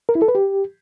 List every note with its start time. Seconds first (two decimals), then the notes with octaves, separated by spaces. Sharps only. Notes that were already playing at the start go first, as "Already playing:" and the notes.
0.09 A#4
0.15 E4
0.22 A4
0.28 B4
0.35 G4